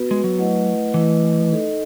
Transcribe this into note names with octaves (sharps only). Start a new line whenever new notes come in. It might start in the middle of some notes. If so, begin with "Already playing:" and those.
Already playing: B3 F#4 B4
G#3
F#3
A3 E4 B4 D#5 F#5
E3 A3 E4 B4 D#5
D#4 A4 D#5